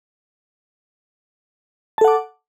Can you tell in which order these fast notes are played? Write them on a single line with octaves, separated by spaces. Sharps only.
A5 A4 F#5 D6